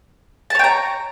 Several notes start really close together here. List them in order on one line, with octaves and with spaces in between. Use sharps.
A5 C#5 G5 A#5